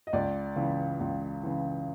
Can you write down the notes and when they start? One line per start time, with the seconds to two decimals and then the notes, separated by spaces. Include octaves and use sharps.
0.07 D#5
0.13 C#2 D5
0.56 C#3 E3
1.00 C#2
1.43 C#3 E3